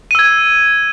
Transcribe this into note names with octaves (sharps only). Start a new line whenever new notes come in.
E6 G#6 D#7